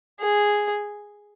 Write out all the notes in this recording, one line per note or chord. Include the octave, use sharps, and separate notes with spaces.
G#4